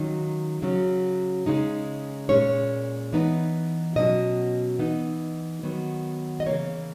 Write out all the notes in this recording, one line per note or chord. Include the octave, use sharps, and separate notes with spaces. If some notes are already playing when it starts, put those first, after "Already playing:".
Already playing: D#3 F#3 A#3 C#4
C#3 F#3 C#4
C#3 G#3 D#4
A#2 G#3 C#4 C#5
E3 B3 D#4
B2 F#3 C#4 D#5
E3 B3 D#4
D#3 F#3 B3
D#5
C#3 E3 A#3 C#5